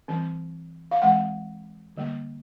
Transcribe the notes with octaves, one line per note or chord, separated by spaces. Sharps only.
E3 G3 C4
F5
E3 G#3 C4 F#5
D3 G3 A#3